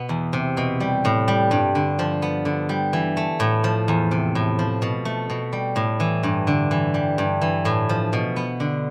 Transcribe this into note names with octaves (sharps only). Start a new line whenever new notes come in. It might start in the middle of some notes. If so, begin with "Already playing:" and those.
Already playing: B2 B3
E2
C3
B2
G3
A2
G3
G2
D3
F3
B3
D3
G3
E3
A3
A2
F3
E2
C3
A2
F3
B2
A3
B2
G3
A2
E3
G2
D3
E3
G3
G2
E3
A2
F3
B2
B3
D3